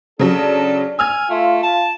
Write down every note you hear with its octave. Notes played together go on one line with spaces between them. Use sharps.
C#3 F#3 D4 A4
G#5 E6 F6 G#6
A3 F4
A5